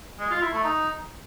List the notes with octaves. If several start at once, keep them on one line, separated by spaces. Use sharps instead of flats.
G#3
F4
E4
A3
D#4